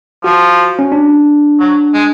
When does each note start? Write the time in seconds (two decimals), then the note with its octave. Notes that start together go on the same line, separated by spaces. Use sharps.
0.24 F3 F#4
0.79 C#4
0.92 D4
1.60 F#3
1.94 G#3